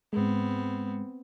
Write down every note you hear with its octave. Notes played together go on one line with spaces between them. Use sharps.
G#2 G#3 B3 C4